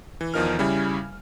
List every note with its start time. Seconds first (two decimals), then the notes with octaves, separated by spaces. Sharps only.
0.21 E3
0.34 E2 D#3 F3 D#4 A#4 F6
0.59 C#3 G3 C#4 E4 G#5